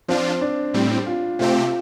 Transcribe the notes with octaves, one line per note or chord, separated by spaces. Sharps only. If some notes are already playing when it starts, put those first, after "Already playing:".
F3 C4 D4 F4
D4
A2 G3 C4
F4
C3 A3 C4 F4 G4